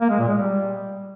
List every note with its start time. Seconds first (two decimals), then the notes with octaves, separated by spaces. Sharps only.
0.01 A#3
0.10 G#3
0.19 A#2
0.28 G#3
0.38 G3